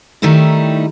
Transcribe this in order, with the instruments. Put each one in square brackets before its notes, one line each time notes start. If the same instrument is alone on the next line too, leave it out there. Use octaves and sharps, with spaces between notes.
[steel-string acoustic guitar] D#3 G3 A3 D#4 E4